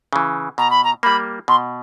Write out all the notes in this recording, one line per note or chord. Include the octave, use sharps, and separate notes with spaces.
C#3 E3
B2 A#5
B5
A#5
G3 A#3 B5
B2 C6